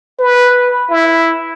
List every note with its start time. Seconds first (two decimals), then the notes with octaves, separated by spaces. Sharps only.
0.19 B4
0.91 E4